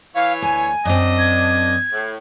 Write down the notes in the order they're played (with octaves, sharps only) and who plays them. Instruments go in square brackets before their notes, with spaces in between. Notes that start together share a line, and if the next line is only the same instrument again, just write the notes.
[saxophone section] E3 C#5 [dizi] F5
[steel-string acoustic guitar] D2 [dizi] G#5
[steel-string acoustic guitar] F#2 C4 [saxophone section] D4 D#5
[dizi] G#6
[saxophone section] A2